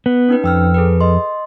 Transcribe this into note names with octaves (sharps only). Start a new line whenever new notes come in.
B3
C#4 D#4 B4
F2 G5 E6 F6
G#4 A4 B4
D#5 C6